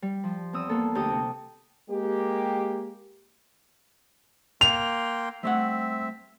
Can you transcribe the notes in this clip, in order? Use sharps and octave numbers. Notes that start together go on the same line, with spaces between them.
G3
F3
E2 C4 D#6 E6
A#3 B3 A4
D2 G4 G5 A5 D#6
C3
G#3 A#3 G4
A#3 G5 C6 F7
G3 A3 C4 E5 F#5